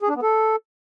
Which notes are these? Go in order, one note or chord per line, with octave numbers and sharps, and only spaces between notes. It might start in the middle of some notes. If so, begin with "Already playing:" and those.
G#4
D4
B3
A4